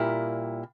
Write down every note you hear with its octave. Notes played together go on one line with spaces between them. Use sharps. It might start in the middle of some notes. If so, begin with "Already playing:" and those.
Already playing: A#2 G3 A#3 E4